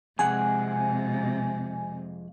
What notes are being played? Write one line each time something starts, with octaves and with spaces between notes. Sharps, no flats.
F2 C3 G#3 G#4 F#5 G#5